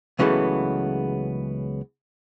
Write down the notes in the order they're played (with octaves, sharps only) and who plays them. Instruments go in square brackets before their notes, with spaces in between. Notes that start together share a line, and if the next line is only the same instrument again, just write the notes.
[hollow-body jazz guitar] C#2 C#3 E3 F#3 A3 B3